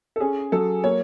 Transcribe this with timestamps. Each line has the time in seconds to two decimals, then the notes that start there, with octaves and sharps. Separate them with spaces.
0.16 A4
0.20 C#4 G#4
0.52 F#3 A4
0.84 A#3 C#5